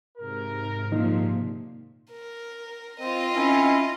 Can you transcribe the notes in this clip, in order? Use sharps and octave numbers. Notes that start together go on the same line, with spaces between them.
G#2 C3 A#4
A#2 D#3 F3 A#3 D#4
A#4
C4 F4 D#5
D#3 C4 C#4 E4